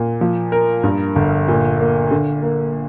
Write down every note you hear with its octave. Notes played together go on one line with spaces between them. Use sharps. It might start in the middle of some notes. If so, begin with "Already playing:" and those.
Already playing: A#2
F3
A#4
G2
G1
A#2
A#3
D3
A#3